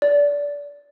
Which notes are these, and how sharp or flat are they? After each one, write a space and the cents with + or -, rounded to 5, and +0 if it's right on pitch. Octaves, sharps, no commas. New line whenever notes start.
D5 -25